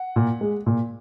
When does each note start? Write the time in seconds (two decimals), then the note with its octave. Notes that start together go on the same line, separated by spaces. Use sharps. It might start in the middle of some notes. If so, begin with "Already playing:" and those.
Already playing: F#5
0.16 A#2
0.41 G#3
0.66 A#2